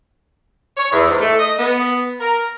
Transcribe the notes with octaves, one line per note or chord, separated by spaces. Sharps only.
C#5
E2
G#2
A3
D#5
B3
A#4